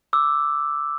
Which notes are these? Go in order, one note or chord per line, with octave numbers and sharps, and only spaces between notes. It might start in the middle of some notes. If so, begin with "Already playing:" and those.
D6 E6